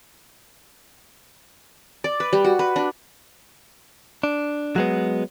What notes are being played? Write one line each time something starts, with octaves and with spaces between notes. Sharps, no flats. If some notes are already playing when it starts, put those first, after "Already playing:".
D5
B4
G3
F#4
B4
D4
D4
F#3 G#3 B3